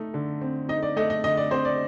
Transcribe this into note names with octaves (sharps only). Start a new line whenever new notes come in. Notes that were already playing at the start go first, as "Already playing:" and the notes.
Already playing: A3 D#4
D3
C4
D#4 D#5
D5
A3 D#5
D#5
D3 D#5
D5
C4 C5
D5